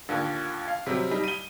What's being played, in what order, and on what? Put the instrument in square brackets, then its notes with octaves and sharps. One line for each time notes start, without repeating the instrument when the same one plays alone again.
[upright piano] D#2 A#2 D3
F5
C3 F#3 G3 C4
G3 D#4
D#7 G7